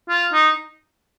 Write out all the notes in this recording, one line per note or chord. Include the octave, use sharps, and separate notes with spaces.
F4
D#4